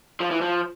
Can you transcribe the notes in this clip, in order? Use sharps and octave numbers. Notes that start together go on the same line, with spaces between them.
F3
E3
F3